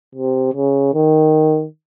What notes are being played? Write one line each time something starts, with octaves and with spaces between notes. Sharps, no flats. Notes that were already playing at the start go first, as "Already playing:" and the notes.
C3
C#3
D#3